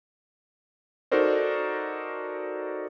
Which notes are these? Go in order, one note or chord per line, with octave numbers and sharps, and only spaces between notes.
D#4 F#4 A4 A#4 C5 D5